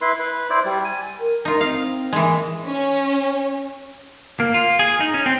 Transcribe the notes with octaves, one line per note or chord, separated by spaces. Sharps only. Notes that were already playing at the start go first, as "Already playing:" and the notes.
E4 B4 C6
B4
E4 C5 D5
G3
G#5
A#4
D#4 F4
C4 F5
E3 G#3 A#3
C#4
A#3
F4
G#4
D#4
C#4
C4